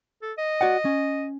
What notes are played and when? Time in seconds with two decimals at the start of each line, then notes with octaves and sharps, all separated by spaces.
0.22 A4
0.38 D#5
0.61 F#4 D5 F#5
0.85 C#4